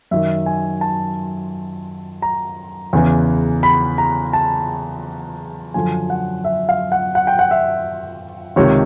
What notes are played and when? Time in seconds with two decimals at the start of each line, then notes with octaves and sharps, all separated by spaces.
0.11 F#2 D#3 E5
0.46 G#5
0.81 A5
2.22 A#5
2.93 E2 C#3 E3
3.63 B5
3.98 A#5
4.33 A5
5.74 F#2 D3 F3 G#5
6.10 F#5
6.44 E5
6.69 F5
6.92 F#5
7.15 F#5
7.27 G5
7.39 F#5
7.51 E5
8.56 C#2 C3 D#3 C#5